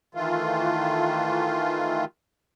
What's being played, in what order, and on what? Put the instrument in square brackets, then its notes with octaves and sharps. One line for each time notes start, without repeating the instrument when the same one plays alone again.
[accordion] D#3 E3 A3 F4